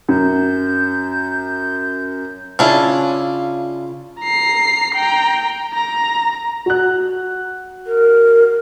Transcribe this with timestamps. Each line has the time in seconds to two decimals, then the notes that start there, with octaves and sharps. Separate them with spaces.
0.09 F#2 G6
2.59 C#3 C#4 D4 E4 F4
4.20 A#5 C7
4.94 G5 A#5
5.74 A#5
6.66 F#4 F#6
7.87 A#4